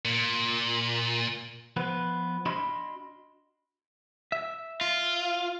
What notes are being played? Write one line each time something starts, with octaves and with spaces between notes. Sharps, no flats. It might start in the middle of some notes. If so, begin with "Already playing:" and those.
A#2
F3 B3 B4
D4 F#4 D#5 B5 C6
E5
F4